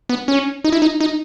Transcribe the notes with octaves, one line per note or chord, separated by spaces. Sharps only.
B3
C#4
D#4
E4
D#4
D#4